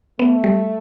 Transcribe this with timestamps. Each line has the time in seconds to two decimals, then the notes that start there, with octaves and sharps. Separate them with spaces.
0.19 A3 B3
0.44 G3